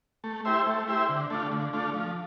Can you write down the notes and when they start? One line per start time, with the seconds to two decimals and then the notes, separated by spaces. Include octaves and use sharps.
0.24 A3
0.45 E4 G4 C5 E5
0.66 A3
0.88 E4 G4 C5 E5
1.09 D3
1.30 A3 D4 F4
1.52 D3
1.73 A3 D4 F4
1.94 F3